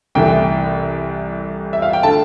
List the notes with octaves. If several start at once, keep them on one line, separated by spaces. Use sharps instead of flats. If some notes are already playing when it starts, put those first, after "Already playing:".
C2 C3 E3 A3 G5
E5
F5
G5
D3 A3 A5